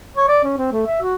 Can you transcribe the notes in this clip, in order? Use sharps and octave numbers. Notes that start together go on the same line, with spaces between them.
C#5
D5
C#4
C4
A3
E5
F#4